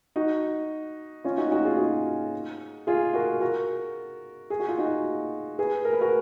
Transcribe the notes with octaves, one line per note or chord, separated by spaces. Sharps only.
D#4 F#4
C#4 F4
D#4 F#4
D#4 F#4
F4 G#4
D#4 F#4
F4 G#4
F#4 A#4
F#4 A#4
G#4
F#4
F4
D#4 F#4
G#4 B4
A#4
B4
F#4 A#4